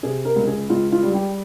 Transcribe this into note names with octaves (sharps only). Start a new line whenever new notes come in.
C3 G#4
A#4
C#2
G#4
C#2 F4
F4
G3
G4